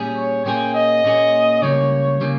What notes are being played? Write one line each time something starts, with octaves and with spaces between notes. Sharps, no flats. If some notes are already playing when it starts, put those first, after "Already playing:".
Already playing: A#2 G3 C#4 G#4
C#5
A#2 A#3 C#4 G#4 G5
D#5
A#2 A#3 C#4 G#4
C#2 C#3 G3 A#3 C#5
C#3 G3 A#3